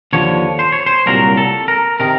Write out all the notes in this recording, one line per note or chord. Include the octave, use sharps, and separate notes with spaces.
D#2 D3 F3 C#5
C5
C#5
C5
C2 A#2 F#3 A#4
A4
A#4
C3 D#3 A#4